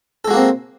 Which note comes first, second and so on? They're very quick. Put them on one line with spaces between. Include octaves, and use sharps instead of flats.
A4 G#3 F#4 A#3 C4